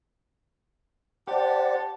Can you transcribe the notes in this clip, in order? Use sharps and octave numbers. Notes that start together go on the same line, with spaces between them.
G4 C5 D5 F#5 A5